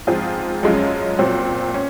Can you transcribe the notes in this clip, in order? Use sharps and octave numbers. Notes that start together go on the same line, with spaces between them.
G#2 F3 C4 F4 G#4
F#2 F3 G#3 C#4 F4
A#2 F#3 C4
C#4